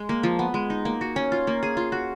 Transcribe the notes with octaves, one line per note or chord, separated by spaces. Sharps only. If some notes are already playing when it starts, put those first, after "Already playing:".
Already playing: G#3
A#3
F3
B3
G#3
D#4
A#3
F#4
C#4
F4
A#3
G#4
F4
F#4